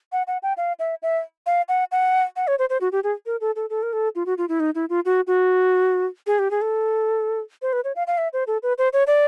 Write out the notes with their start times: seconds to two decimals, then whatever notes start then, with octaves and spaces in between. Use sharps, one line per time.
0.12 F#5
0.27 F#5
0.43 G5
0.57 F5
0.79 E5
1.02 E5
1.46 F5
1.69 F#5
1.92 F#5
2.36 F#5
2.47 C#5
2.59 C5
2.70 C5
2.81 F#4
2.92 G4
3.04 G#4
3.26 A#4
3.41 A4
3.56 A4
3.70 A4
3.83 A#4
3.93 A4
4.15 F4
4.26 F#4
4.38 F4
4.49 E4
4.60 D#4
4.75 E4
4.90 F4
5.05 F#4
5.27 F#4
6.27 G#4
6.39 G4
6.51 G#4
6.61 A4
7.62 C5
7.73 B4
7.84 C#5
7.96 F5
8.07 F5
8.18 E5
8.33 C5
8.47 A4
8.63 B4
8.78 C5
8.93 C#5
9.07 D5